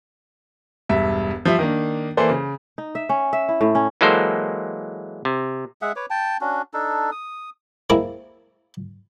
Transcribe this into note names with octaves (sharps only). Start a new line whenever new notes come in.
E1 G2 E5
F3 G3 E5
D#3 A#3 D4
E3 A#3 A4 C5 D5
C#3
D#4
E5
C#4
E5
E4
A2
C#4
E3 F#3 G#3 A#3 A4 C5
C3
G#3 G#4 E5 F#5
B4 C#5 D6
G5 A5
C#4 D4 F#4
D4 D#4 A4
D#6
G#3 A#3 C4 E4